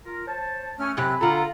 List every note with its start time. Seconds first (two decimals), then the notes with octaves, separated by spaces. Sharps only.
0.05 F4 A#4
0.28 C5 C#5 A5
0.79 A3 C#4 F6
0.97 F#2 C3 G4 G#5 B5 F#6
1.21 D3 A3 F4 A#5